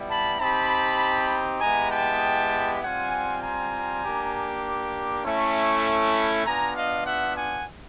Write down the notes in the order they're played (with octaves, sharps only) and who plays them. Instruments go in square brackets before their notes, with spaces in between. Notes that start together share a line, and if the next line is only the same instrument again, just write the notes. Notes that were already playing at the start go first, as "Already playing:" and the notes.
Already playing: [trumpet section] G3 B3 E4
A5 B5
C4 D#4 G4 A5 B5
G#3 B3 E4 G4 G#5 A#5
G5 A5
G3 C4 F4 F#5 G#5
G#5 A#5
A#3 D4 G4
A3 C#4 E4
B3 D4 F4 G#5 A#5
D#5 F5
E5 F#5
F#5 G#5